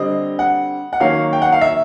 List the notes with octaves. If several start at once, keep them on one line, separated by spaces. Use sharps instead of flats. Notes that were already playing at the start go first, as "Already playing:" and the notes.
Already playing: D3 G3 C4 D#5
F#5
F#5
D#3 F#3 A#3 C#4 F5
G5
F#5
F5
E5